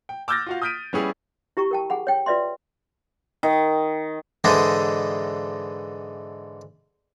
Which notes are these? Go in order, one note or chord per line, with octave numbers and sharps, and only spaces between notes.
G5
D6 E6 F6 G6 A6 A#6
F4 F#4 F5
D#6 F6 G6 B6 D7 D#7
G3 B3 C#4 E4 G4 G#4
E4 G4 A#5 C#6
A#4 G5 A5
G#4 F#5 B5
C#5 G5
F4 B4 D5 E5 C6
D#3
G#2 D3 E3 G#3 D4 D#4